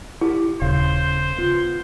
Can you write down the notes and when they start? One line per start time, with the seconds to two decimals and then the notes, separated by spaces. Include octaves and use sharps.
0.21 E4 G4
0.62 D#1 C#3 A4 C5 F5
1.38 B3 F4